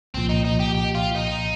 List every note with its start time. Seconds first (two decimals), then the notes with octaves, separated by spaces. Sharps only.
0.14 C2 A#2 F3 C4
0.29 D#4
0.45 D#4
0.60 G4
0.75 G4
0.95 F4
1.15 D#4